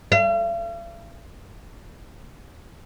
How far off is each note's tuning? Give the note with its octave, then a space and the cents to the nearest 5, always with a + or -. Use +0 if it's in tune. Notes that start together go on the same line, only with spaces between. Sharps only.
F5 -45